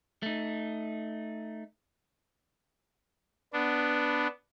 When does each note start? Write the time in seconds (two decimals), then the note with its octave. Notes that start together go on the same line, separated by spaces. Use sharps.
0.23 A3 D#4
3.53 B3 D4